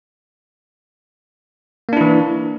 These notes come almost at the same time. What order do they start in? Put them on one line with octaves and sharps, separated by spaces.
A#3 D4 E4 E3